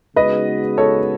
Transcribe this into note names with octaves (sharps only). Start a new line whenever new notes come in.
C#3 G#3 B3 D#4 F#4 B4 D#5
A4 C#5